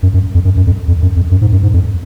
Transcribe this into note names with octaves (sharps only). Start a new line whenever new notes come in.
F#2
F#2
F2
F#2
F#2
F2
F2
F#2
F2
F#2
G#2
F#2
G#2
F2